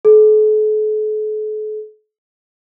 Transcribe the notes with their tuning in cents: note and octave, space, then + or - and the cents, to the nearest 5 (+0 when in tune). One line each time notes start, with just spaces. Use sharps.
A4 -45